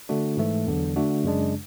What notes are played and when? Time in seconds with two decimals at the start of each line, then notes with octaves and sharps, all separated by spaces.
0.09 D3 A3 D4 F#4
0.37 G#2 E3 A3
0.66 E2 D3 F#3
0.96 D3 A3 D4 F#4
1.24 F#2 C#3 G#3 D4